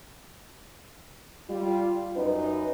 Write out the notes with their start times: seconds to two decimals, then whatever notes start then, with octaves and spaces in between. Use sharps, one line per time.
1.49 G3 F4
2.16 F#2 D#4 B4